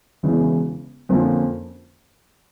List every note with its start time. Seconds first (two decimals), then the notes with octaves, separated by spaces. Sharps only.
0.23 E1 E2 C#3 E3
1.09 F2 D3 F3 A#3 C#4